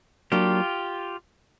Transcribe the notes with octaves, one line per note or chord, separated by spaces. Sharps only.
F#3 A#3 D4 F4 G4